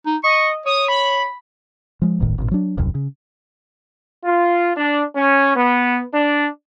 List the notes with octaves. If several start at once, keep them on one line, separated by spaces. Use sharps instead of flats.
D#4
D#5 C#6
C#5 D#6
B5
F3 G#3
D1 G1 A2 D#3
G#1 A#2
F#3 D4
D#1 C2 F#2
C#3
F4
D4
C#4
B3
D4